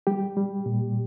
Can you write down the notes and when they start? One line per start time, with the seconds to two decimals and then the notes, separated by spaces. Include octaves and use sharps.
0.07 G3 G4
0.37 G3
0.66 A#2